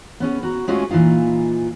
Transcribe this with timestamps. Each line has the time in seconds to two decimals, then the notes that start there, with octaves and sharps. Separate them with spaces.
0.20 B3 C#4 G#4
0.43 F#4 A#5
0.68 G#3 A3 C#4 F4 F#4 G#4
0.91 A#2 E3 A#3 D#4 F4